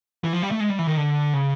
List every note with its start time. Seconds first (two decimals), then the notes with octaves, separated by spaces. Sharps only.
0.24 E3
0.33 F3
0.42 G3
0.51 A3
0.60 G#3
0.70 G3
0.79 E3
0.87 D#3
0.97 D3
1.34 C#3